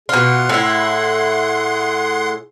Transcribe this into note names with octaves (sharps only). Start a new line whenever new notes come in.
B2 F4 G#4 F#5 C6
A2 E4